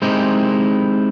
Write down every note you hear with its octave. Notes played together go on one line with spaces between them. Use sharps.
G#3 C4 D#4 E4 G4